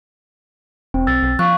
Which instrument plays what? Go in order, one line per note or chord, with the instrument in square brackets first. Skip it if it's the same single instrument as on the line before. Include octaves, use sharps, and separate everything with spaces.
[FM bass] E1 [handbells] C4
[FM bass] B1 [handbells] E6 A6
[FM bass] B1
[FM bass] F3 [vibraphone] F5 C#6 [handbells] F#6